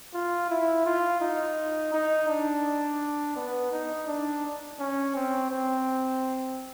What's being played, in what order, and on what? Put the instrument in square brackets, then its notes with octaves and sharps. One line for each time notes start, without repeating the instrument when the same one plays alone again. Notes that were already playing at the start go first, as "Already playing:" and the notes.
[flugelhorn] F4
E4
F4
D#4
D#4
D4
B3
D#4
D4
C#4
C4
C4